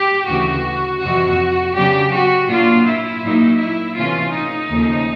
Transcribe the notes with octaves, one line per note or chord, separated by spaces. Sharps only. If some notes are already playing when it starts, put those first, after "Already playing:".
Already playing: G4
D2 C#3 E3 F#4
F2 C3 E3 F#4
C#3 F#3 B3 D4 G4
F#4
A#2 F#3 A#3 D4 F4
E4
A#2 F#3 A#3 D#4
E4
C3 E3 A3 C#4 F4
D#4
D#2 C#3 F3 A3